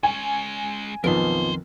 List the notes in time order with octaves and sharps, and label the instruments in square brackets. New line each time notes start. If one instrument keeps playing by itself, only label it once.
[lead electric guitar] G#3 C#4 [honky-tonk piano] G#5
[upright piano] B1 F3 B3 [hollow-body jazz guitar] F2 D#3 [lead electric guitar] A#4 C6